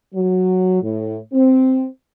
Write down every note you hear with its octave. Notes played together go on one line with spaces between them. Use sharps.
F#3
A2
C4